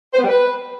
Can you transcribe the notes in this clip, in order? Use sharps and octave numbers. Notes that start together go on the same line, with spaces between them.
C5
B3
G3
B4